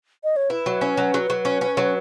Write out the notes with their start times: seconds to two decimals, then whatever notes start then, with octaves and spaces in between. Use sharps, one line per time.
0.24 D#5
0.36 C#5
0.50 E4 B4
0.66 F#3
0.81 C#4
0.97 F#3
1.14 F#3
1.30 F#3
1.45 C#4
1.61 C#4
1.77 F#3